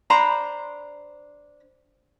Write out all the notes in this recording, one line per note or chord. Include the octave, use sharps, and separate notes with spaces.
D4 C5 A#5 B5